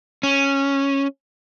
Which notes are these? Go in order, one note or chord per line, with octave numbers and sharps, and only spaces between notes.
C#4